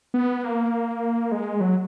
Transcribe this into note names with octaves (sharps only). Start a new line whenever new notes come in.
B3
A#3
G#3
F#3